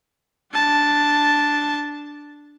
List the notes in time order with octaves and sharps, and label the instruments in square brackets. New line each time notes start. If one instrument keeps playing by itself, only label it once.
[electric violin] D4 A5